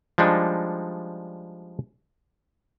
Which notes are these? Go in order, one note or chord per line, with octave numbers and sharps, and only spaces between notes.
F3 G3 G#3 D4 D#4